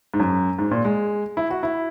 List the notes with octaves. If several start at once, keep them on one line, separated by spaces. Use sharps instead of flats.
G#2
F#2
G#2
A#2
G#3
E4
F#4
E4